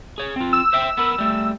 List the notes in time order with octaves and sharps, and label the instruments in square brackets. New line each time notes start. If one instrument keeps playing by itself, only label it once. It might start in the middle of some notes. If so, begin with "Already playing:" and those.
[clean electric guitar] G#4 C#5
C4 F4
[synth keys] E6
[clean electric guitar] C5 E5 G5
B3 A#4 B5
G3 A3